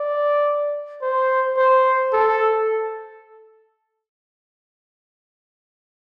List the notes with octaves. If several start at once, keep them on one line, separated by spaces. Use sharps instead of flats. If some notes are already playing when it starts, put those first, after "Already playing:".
Already playing: D5
C5
C5
A4